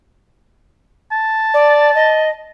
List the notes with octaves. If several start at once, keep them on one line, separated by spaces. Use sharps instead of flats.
A5
D5
D#5